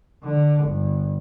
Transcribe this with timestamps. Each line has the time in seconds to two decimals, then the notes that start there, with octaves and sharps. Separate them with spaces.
0.24 D3
0.64 G1